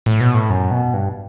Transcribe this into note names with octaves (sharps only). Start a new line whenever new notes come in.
A2
B2
A2
F#2
B2
G2